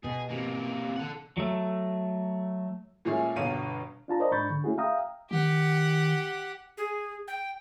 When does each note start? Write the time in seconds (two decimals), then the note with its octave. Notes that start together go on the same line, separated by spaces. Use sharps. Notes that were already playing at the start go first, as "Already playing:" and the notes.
0.04 B2 G#4
0.30 C3 A#3
0.96 A4 F#5
1.37 F#3 A3
3.05 A#2 G#3 A3 C#4 G#4
3.36 G1 B2 C#5 F5 D#7
4.08 D4 F4 A5 A#5
4.20 A#4 C5 D5 D#5 A#5
4.31 G#2 D4 B5 C#6 G6 A6
4.50 D3
4.64 A3 C#4 E4 F#4 G#4
4.78 E5 F5 G5 A#5 D#6
5.31 D#3 G4 F#5
6.77 G#4
7.28 G5